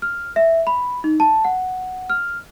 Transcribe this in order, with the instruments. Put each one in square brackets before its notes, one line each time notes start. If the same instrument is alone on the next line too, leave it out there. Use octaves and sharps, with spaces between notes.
[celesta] F6
E5
B5
D#4
A5
F#5
F6